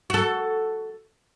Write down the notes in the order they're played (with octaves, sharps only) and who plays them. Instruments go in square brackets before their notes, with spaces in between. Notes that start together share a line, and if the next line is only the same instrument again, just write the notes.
[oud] F#4 A4